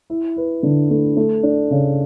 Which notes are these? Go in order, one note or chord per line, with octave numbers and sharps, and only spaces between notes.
E4
B4
D3
A3
A3
D4
C#3